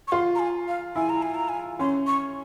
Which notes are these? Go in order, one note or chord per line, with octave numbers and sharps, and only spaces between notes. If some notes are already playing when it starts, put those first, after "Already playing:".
C#6
F4 C6
A#5
G#5
F5
E4 G#5
A#5
G#5
A#5
G#5
C#4 C6
C#6